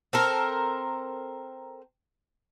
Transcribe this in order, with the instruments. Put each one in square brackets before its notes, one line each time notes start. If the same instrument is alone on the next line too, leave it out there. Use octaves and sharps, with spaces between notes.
[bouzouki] C4 A4 A#4